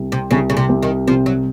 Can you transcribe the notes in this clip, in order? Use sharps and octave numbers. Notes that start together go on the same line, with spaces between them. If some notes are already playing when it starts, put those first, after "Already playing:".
Already playing: C2
C3
C2 C#3
C#3
C3
C2
D#3
C3 F3
F#3